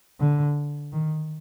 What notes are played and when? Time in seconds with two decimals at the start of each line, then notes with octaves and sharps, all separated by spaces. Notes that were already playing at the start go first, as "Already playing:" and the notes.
0.20 D3
0.93 D#3